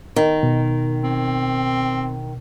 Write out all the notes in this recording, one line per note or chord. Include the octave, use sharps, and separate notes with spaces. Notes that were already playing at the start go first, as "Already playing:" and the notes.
D#3
B2
C4